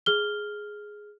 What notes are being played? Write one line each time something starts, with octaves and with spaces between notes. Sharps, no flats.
G#4 F6 G7